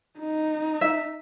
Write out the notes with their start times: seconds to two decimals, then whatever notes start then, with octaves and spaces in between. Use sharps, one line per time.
0.19 D#4
0.81 E5